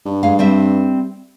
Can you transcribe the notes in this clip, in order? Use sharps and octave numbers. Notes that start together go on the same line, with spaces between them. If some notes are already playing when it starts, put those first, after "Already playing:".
G2
G#3 F5
G3 C4 E5